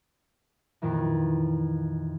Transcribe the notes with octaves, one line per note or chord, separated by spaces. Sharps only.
F2 A#2 D#3 E3